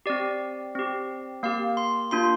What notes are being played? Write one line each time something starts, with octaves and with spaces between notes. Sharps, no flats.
C4 G4 D5
C4 G4
A#3 G4 F5
C6
A#3 D4 F4 C6